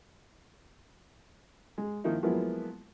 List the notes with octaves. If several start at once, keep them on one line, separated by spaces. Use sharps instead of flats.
G#3
D#3 F3 A#3 D#4 E4
F3 F#3 G#3 A#3 B3 E4